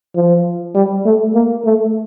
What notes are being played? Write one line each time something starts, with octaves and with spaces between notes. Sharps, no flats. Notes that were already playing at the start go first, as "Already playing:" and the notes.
F3
G3
A3
A#3
A3